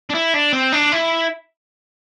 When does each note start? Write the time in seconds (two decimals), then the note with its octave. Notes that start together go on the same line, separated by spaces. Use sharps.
0.10 D4
0.15 E4
0.34 D4
0.53 C4
0.72 D4
0.92 E4